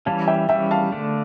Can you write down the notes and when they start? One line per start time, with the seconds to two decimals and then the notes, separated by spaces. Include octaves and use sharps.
0.06 E3 G3 C#4 F5 A5
0.27 E5 G5
0.49 E3 G3 C#4 E5 G5
0.71 F5 A5
0.92 D3 A3 D4